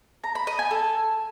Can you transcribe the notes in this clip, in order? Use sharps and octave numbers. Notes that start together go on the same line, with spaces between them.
A#5
B5
D#5
G#5
A4